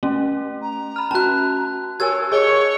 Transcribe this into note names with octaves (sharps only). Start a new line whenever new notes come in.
A3 C#4
A#5
B5 F6
C#4 F#4 A5 F#6
G4 A#4 C#5 G#5 E6 G#6
G#4 C#5 D#5 G7